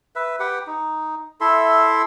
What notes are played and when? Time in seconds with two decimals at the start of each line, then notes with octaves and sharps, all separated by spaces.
0.16 B4 E5
0.40 G4 B4 F#5 G5
0.67 D#4
1.41 E4 A4 E5 C6